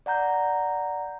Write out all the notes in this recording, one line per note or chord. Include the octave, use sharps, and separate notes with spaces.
D5 F#5 A#5 G6